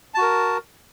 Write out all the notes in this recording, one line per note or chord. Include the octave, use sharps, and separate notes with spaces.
F#4 A#4 A5